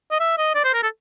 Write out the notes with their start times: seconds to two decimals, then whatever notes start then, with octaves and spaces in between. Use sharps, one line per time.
0.11 D#5
0.20 E5
0.38 D#5
0.55 D5
0.64 C5
0.74 A#4
0.83 A4